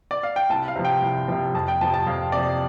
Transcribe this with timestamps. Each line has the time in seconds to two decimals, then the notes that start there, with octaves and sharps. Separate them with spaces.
0.11 D5
0.23 F5
0.36 G5
0.49 C2 A5
0.68 F5
0.76 C3 F3
0.85 G5
1.02 C2
1.28 C3 F3
1.54 F2 A5
1.68 G5
1.81 C3 F3 A5
1.94 A5
2.07 F2 F5
2.32 C3 F3 D5